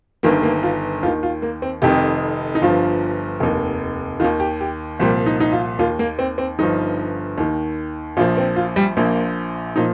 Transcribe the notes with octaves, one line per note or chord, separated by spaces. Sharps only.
G1 G2 D#3 A#3
A#3
F4
D#2 D#3 F4
F4
A#3
C4
F1 F2 D#3 G4
D#4
G1 G2 F3 F4
F1 D#2 D#3
D#2 D#3 F4
G4
G4
C2 A#2 F3 G3
D#4
D#4
F4
D#2 D#3 F4
A#3
C4
C4
G1 G2 F3 D#4
D#2 D#3
A#1 A#2 F3 F4
C4
F4
G3
A#1 A#2 F3 A#3
A#2 F3 D#4